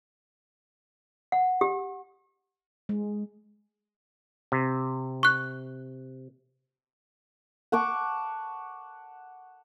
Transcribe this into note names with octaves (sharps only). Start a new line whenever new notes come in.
F#5
G4
G#3
C3
C#6 F#6
F#5 A5 C#6 D6